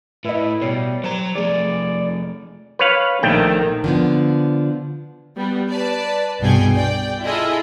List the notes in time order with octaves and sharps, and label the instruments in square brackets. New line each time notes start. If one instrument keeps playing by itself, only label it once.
[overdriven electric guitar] A2 [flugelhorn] E4 [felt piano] B4 D#5
[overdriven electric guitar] B2 [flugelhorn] G3 [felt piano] C#5 C7
[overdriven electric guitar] F#3 A#5 [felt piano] C5 E7
[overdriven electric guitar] F3 A3 [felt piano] G#4 [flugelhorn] D5
[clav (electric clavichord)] B4 C#5 F5
[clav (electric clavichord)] A#1 A3 G5 [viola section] D#3
[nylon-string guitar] D3 F3 B3
[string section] G3 B3
B4 D5 A5
C2 G2 B2 G#4 G5 G#5
D5 G5
E4 F4 G#4 A4 D#5 E5